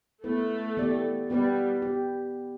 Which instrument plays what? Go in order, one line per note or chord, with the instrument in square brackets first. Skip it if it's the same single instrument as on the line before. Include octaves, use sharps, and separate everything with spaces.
[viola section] A3 [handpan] B3 E4 B4
[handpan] E3 B3 G4 D5
[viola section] G3 [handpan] B3 G4 B4 D5
[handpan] G4